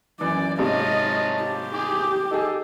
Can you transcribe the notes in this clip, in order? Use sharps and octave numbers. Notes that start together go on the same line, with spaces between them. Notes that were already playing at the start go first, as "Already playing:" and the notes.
F#2 E3 D5
G#2 C3 C#5 D#5 F5 A5
G4
G#4 D6
D#4 G#4 A4